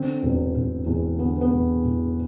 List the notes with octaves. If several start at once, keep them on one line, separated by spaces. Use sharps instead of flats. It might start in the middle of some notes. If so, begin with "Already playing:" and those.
Already playing: D3 C4
E1
E1
E2
D3 B3
B3
E1
E1